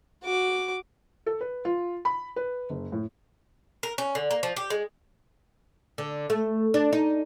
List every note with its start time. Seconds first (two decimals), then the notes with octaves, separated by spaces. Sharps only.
0.24 F#4 D6
1.26 A4
1.41 B4
1.65 F4
2.05 B5
2.36 B4
2.70 F#1
2.92 A2
3.83 A#4
3.98 C#4
4.15 D3
4.31 A#3
4.43 F3
4.56 G4
4.70 G#3
5.98 D3
6.30 A3
6.74 D4
6.93 D#4